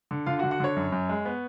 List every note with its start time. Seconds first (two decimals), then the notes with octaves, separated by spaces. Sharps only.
0.11 D3
0.26 D3 F4 F5
0.39 F#4 F#5
0.43 D3
0.51 F#4 F#5
0.60 D3 C#5
0.76 F#2
0.92 F#2
1.09 G#3
1.25 B3